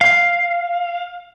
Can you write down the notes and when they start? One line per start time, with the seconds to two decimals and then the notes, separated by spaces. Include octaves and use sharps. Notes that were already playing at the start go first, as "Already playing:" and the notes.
0.01 F5